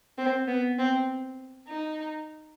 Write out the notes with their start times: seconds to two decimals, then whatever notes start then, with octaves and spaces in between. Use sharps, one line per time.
0.18 C4
0.47 B3
0.79 C4
1.68 D#4